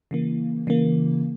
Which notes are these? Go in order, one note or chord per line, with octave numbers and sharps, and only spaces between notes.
C#3 E3 A#3
C#3 E3 A#3